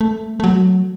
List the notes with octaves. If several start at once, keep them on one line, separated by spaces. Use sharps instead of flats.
A3
A3
F#3